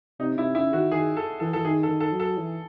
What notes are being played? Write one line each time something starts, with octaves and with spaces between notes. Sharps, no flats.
C3 D#4
C3 E4
C#3 E4
D#3 F#4
D#3 G#4
A4
E3 A4
E3 A4
D#3 G#4
A4
D#3
A4
F#3
A4
E3